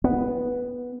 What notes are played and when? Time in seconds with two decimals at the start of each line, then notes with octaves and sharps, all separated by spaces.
0.04 B3